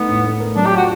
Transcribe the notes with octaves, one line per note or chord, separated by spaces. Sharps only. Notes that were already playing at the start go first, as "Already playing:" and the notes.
Already playing: A3 B3 D#4
A2
A3
A#4
F#3 D4
G4
F4 F#4